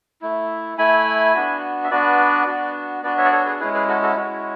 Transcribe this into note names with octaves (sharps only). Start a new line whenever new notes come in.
A3 E4
A3 E4 G#5 B5
B3 D4 F#4
E5
B3 D4 F#4 B4 D5
B3 D4 F#4
B3 D4 F#4 B4 D5
C#5 E5
D5
A4 C#5
G#4 B4
G#3 C#4 E4 G#4 B4
G#4 B4
F#4 A4
F#4 A4
G#3 C#4 E4 F#4